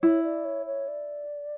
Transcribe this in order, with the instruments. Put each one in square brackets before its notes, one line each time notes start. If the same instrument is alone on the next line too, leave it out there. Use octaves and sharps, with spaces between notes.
[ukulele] E4 [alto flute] C#5
[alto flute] D5
C#5
C#5
D5